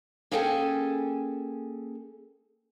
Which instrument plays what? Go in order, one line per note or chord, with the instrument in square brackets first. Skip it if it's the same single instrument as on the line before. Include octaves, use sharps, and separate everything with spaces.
[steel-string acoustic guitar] A#3 C#4 G#4 A4 G5 G#5